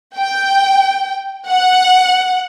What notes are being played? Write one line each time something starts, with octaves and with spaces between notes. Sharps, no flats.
G5
F#5